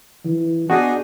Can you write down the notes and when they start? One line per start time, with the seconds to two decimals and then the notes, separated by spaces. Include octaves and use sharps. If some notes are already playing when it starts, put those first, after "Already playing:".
0.25 E3
0.70 B3 D4 D#4 F#4 G#4